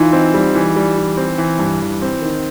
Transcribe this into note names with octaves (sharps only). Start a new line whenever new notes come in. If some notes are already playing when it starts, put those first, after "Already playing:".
Already playing: E3 D#4 F4
C4
G3
E3
G3
E3
C4
E3
G2
E3
C4
D#3